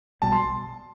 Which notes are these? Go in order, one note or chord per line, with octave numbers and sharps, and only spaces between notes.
B1 B2 G3 B3 A5
C6